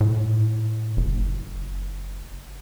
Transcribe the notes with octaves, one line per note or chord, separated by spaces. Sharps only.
A2
F#1